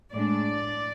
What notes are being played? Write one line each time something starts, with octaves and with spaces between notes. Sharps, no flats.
A2 G#3 D4 D5